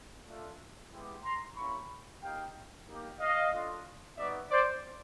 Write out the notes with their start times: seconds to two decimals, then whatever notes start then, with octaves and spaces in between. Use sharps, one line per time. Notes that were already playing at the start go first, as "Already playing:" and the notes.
0.26 A3 D4 F4
0.91 G#3 B3 E4 G4
1.23 A#5 C6
1.56 A#3 C#4 E4 G4 B5 C#6
2.21 A#3 D#4 G4 F5 G5
2.87 A#3 D#4 G4
3.19 D#5 F5
3.52 A3 D4 F4
4.17 G3 B3 D#4 F#4 D5 E5
4.50 C5 D5